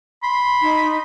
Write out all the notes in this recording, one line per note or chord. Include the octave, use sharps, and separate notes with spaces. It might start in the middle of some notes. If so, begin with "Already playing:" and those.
B5 C6
D#4